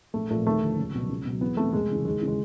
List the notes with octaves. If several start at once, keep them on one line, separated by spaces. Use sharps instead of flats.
A#1 A3
A#2 F3 A3
D#2 A3
D3 F3
C#2
B2 F#3
C#2
B2 F#3
E2 B3
C3 E3 A3
F1 G#3
E2 C#3 E3
D#2 G#3
C#3 E3
G#3